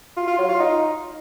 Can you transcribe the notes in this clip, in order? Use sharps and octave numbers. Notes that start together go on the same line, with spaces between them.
F4
F4
F#3
F4
D#4